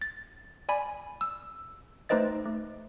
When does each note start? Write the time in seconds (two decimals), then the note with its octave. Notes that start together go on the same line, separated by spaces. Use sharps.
0.02 A6
0.69 D5 G#5 B5
1.21 E6
2.09 A3 D#4 B4 C5 D#5 A6
2.45 A3